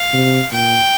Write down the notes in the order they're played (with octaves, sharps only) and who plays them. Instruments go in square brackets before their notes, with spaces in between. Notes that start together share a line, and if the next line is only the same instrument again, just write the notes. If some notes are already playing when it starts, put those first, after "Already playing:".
Already playing: [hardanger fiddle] F5
[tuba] C3
[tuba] A#2 [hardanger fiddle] G5